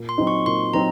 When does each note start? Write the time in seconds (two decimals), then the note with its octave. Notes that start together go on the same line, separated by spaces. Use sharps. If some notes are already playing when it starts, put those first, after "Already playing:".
Already playing: A#2
0.09 C6
0.18 F#3 C4 D#4
0.27 C#6
0.46 A#2 C6
0.74 F#3 C4 D#4 A#5